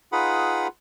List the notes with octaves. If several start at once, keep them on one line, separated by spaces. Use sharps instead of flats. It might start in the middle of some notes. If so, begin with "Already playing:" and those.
D#4 F4 G#4 B4 F#5 B5